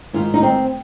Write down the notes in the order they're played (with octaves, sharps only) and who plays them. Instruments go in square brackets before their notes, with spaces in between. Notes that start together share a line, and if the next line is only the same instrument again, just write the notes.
[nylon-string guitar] G#2 D#3 F4
D#4
C4